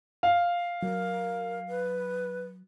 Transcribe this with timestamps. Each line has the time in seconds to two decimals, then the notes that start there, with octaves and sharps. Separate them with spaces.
0.23 F5
0.83 F#3 A#4
1.68 B4